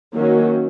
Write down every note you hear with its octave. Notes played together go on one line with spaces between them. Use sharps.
D#3 F#3 A#3 C#4